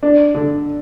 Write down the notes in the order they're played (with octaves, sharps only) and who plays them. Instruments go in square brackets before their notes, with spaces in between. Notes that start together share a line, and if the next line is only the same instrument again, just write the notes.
[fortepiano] D4
D3